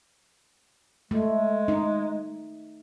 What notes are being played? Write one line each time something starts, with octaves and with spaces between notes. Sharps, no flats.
G#3 A3
D#4